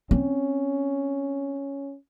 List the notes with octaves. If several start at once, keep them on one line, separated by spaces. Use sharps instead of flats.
C4 C#4